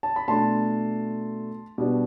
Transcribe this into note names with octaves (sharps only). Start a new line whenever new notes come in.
A5
B5
B2 A3 D4 A5 C6
B2 G3 B3 D4